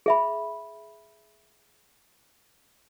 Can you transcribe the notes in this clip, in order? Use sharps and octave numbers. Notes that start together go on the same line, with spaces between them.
G#4 E5 B5